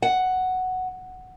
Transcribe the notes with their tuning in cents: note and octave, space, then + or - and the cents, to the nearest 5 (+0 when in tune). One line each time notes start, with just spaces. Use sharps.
F#5 +5